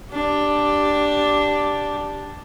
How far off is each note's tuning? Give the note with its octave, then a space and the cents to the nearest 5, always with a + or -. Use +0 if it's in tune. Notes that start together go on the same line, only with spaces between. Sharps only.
D4 +0 G4 +0